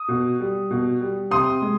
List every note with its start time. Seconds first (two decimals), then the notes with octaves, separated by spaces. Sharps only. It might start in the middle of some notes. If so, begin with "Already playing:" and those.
Already playing: D#6
0.08 B2
0.40 G3
0.71 B2
1.01 G3
1.31 C3 C6 D#6
1.62 G#3